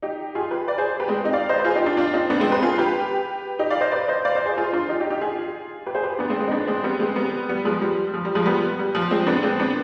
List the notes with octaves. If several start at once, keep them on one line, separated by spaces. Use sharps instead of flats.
D#4 G4
F4 G#4
G4 B4
B4 D5
G#4 C5
G4 B4
G#3 C4
D#4 G4
D5 F5
C5 D#5
B4
F4 G#4
D#4 G4
D4 F4
D4 F4
C4 D#4
B3 D4
G#3 C4
G4 B4
F4 G#4
G4 B4
D#4 G4
D5 F5
C5 D#5
B4 D5
C5 D#5
D5 F5
C5 D#5
G#4 C5
F4 G#4
D4 F4
D#4 G4
D#4 G4
D#4 G4
F4 G#4
G4 B4
G#4 C5
G4 B4
B3 D4
G#3 C4
G#3 C4
D#4
B3 D4
G#3 C4
G3 B3
G#3 C4
G3 B3
G3 B3
F3 G#3
G3
F3
G3
F3 G#3
G3 B3
G3
F3
G#3 C4
B3 D4
G#3 C4
B3 D4